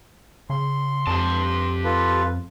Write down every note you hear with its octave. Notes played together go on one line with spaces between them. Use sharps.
C#3 C6
F2 G4 A5
F4 A4 B4